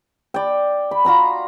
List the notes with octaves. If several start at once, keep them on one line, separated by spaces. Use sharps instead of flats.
D5 G5
B5
F4 F#4 A#5 B5